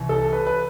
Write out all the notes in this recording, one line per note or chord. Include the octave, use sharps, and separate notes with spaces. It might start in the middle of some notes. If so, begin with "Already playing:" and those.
Already playing: C2 E3
A4
B4
B4